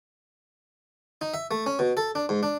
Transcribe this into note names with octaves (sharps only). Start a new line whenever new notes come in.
D#4
E5
A3
C#4
B2
A4
D4
G#2
D4